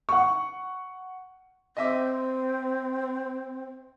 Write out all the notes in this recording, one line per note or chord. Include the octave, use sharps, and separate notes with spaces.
F#5 C#6
C4 D#5 E5 D6